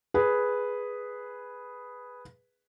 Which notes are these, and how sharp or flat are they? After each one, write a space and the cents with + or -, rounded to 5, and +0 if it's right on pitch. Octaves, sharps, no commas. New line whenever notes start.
G#4 +0 B4 +0